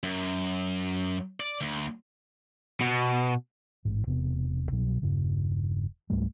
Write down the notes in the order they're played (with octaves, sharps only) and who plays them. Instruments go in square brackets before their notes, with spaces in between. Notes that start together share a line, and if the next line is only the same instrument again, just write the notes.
[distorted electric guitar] F#2
D5
D2
[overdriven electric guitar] B2
[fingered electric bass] A1 G#2
E1 C3 B3
C2 B2 F#3
E1 G2 C#3
C#2 G#2 G3 A3